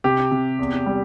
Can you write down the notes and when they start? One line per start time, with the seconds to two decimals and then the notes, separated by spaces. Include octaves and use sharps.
0.04 C3 G4
0.31 C3
0.59 E2
0.86 G3